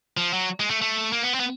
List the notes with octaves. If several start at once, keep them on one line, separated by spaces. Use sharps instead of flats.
F3
F#3
G#3
A3
A3
A#3
B3
C4
B3